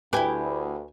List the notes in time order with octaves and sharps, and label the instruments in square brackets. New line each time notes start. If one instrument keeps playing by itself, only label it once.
[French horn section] D2 [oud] E4 G4 [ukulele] B4 G#5